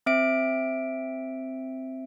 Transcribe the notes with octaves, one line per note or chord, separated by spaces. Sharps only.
C4 E5 D7